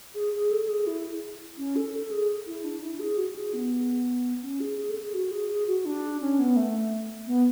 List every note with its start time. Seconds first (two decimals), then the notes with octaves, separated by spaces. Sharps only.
0.15 G#4
0.34 G#4
0.51 A4
0.69 G#4
0.87 E4
1.58 C#4
1.76 A4
1.93 A4
2.11 G#4
2.47 E4
2.64 D4
2.82 E4
3.00 G#4
3.18 F#4
3.36 G#4
3.54 B3
4.42 C#4
4.60 G#4
4.78 G#4
4.90 A4
5.02 G#4
5.14 F#4
5.31 G#4
5.49 G#4
5.67 F#4
5.86 D4
6.21 C#4
6.39 B3
6.56 A3
7.27 B3